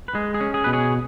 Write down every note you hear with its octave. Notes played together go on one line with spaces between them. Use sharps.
B4
G#3 G#4
G#4
C#4
G#4
B2 B4
G#4 C#5